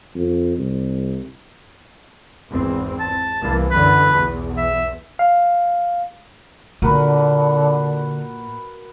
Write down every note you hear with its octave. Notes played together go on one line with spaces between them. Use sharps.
F2
C2
G#1 E2 C4
A5
C2 E3 A#3
F#2 D3 E3 B4
B1 E2
E5
F5
A#2 D3 F#4 A#4 B4